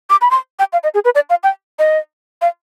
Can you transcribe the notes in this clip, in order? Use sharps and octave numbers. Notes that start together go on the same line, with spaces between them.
D6
B5
C6
G5
F5
D#5
G#4
B4
D5
F5
G5
D#5
F5